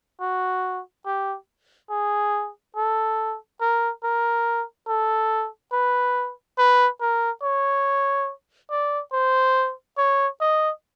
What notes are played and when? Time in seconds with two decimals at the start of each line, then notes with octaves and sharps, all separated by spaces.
0.21 F#4
1.06 G4
1.90 G#4
2.76 A4
3.61 A#4
4.03 A#4
4.88 A4
5.72 B4
6.58 B4
7.01 A#4
7.42 C#5
8.70 D5
9.13 C5
9.97 C#5
10.41 D#5